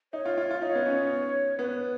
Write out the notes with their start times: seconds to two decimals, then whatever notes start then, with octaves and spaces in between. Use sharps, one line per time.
0.13 D#4 C#5
0.25 F4
0.38 F4
0.51 F4
0.62 D#4 C#5
0.75 B3
0.86 C#4
1.59 B3 B4